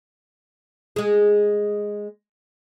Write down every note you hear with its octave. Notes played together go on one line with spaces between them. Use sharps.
G#3 G#4